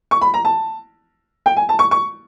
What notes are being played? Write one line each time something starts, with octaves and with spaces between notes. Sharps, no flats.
C#6
B5
A#5
A5
G5
G#5
A5
C#6
C#6